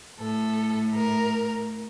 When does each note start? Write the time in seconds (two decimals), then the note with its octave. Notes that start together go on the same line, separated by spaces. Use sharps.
0.20 A2 A4
0.96 A#4